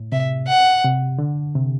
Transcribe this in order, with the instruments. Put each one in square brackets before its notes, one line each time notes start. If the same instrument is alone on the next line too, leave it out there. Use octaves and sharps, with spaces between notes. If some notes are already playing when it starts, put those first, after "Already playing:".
Already playing: [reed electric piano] A2
[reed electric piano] C3 [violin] E5
[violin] F#5
[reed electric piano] C3
D3
C3